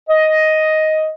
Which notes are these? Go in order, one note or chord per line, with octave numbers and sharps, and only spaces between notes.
D#5